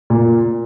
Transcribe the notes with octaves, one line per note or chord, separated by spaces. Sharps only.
A#2